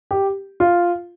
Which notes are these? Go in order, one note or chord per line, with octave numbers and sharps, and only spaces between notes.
G4
F4